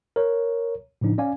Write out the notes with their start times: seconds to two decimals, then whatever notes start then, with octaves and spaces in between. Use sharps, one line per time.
0.16 A#4 C#5
1.01 A2 C#3 F3 D4 D#4
1.18 C#4 D5 F5 G#5